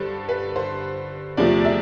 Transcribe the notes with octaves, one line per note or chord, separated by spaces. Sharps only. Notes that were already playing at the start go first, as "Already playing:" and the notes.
Already playing: G2 D3 A4 C5
B4
C5
E2 C3 F3 A3 D5
E5